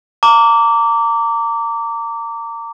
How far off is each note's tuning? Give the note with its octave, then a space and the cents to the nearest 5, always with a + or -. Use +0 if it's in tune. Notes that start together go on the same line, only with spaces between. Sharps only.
A#5 -30 D6 -20